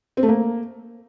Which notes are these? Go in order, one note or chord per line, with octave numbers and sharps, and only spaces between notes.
C4
A3
A#3